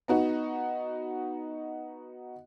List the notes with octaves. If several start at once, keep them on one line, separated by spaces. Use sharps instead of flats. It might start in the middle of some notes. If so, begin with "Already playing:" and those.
B3 D#4 F#4